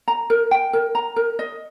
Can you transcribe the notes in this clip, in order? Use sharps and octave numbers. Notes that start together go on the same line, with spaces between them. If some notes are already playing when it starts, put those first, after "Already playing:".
A#5
A#4
G5
A#4
A#5
A#4
D#5